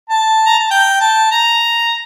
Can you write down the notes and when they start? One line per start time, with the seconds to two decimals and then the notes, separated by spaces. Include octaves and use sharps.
0.10 A5
0.46 A#5
0.59 A5
0.71 G5
1.01 A5
1.31 A#5